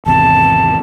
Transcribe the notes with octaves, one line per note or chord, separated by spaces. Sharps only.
G#1 E2 C3 A5